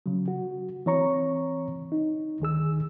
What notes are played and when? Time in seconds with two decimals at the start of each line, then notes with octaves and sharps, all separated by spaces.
0.06 C#3 F#3
0.28 F#4
0.86 E3 C4 C#5 A#5 C#6
1.92 D#4
2.40 D2 D#3 G#4 E6